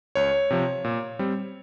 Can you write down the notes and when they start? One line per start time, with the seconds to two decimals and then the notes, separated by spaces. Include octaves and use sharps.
0.15 C#2 C#5
0.50 C3 F3
0.84 A#2
1.19 G3 C4